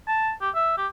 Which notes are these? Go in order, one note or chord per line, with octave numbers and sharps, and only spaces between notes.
A5
G4
E5
G4